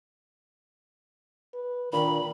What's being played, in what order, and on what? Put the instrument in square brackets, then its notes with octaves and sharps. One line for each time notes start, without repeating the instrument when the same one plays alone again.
[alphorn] B4
[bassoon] A#2 [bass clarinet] D#3 [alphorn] D4 [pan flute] B5